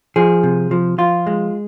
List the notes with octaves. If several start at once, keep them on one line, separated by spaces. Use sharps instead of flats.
F3 G#4
C3
F3
F3 F4
G#3